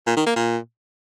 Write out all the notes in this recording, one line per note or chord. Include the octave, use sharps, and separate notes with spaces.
A#2
D#3
A#3
A#2